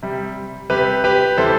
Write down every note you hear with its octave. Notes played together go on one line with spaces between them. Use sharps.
C3 G3
C3 G3 G4 B4
G4 B4
C3 E3 G3 A4 C5